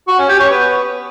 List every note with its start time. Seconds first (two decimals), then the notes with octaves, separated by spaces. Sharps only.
0.08 F#4
0.18 C#4
0.29 G4
0.40 C#5
0.50 B3